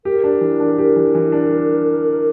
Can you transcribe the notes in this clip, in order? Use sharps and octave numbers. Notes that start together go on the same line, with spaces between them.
G4 A#4
D4
E3
D4
G4 A#4
E3
E3
D4